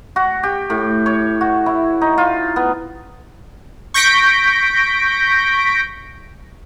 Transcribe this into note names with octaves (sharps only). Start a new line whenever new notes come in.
F#4
G4
A2
C#5
F#4
E4
D#4
F4
B3
C#6 G6 A#6 B6 D7